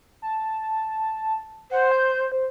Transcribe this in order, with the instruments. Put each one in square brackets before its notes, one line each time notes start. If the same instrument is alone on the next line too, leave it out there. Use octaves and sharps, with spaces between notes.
[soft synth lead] A5
[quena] C5 [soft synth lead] F#5
[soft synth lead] G6
C5